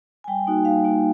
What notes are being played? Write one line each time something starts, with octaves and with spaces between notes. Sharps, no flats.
G#5
G3 G5
A#3 D#4 F#4
G3 F5
A#3 D#4 F#4